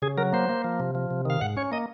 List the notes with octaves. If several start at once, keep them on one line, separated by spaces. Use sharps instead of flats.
C#3 G#4
F#3 A#4
A#3 C5
A#3
F3
C3
F3
C3
D#3 F5
G#2 F#5
C#4 C#5
A#3 D#5